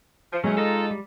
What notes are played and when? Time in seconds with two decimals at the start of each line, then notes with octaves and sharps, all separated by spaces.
0.32 F3
0.44 E3 F#3 G#3 A3 C#4
0.57 D#4 F4 A4 A#5
0.91 G3